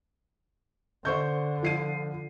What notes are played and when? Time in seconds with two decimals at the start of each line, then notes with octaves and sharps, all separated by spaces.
1.05 D3 C5 C#6 G6
1.63 F3 C7 D#7